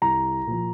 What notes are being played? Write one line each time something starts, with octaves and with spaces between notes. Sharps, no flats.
C2 A#5
A#2 F3